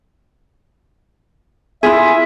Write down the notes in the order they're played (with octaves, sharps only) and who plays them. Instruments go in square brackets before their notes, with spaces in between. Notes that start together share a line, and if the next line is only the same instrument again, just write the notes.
[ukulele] E4 F4 G#4 [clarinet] E5